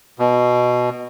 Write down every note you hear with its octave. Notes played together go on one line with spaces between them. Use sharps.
B2